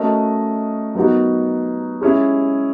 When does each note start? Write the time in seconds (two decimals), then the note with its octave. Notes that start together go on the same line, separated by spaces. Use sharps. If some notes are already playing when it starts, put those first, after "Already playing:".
Already playing: A3 C#4 F#4 A#4 D#5
0.95 F#3 B3 D#4 F#4 A#4
2.01 G#3 C#4 E4 G#4